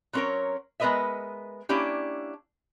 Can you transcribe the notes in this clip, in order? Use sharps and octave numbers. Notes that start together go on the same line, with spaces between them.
F#3 C4 C#4 A4 A#4 C#5
G#3 B3 A#4 B4 D#5 E5
A#3 C#4 D4 E4 G4